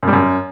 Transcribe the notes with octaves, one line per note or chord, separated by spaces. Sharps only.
F#2
G3
F#2